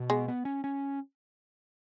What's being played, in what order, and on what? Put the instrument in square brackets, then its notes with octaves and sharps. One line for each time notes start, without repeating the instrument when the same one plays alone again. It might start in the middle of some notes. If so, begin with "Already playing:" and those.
Already playing: [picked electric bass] B2
[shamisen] G#3 [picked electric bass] B3
[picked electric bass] B3
C#4
C#4